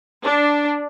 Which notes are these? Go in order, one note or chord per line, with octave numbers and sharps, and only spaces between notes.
D4